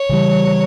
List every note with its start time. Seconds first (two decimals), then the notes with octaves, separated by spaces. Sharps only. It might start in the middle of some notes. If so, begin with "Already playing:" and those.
Already playing: C#5
0.09 C#3 E3 G3